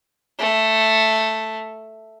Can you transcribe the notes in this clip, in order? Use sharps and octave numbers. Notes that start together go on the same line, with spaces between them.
A3